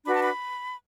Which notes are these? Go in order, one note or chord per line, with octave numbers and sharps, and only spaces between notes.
D4 F#4 B4 B5
A5
B5